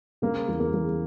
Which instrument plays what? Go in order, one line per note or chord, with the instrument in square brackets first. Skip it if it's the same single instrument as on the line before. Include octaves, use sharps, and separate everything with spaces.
[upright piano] C#3 A#3
E2
A#3
E2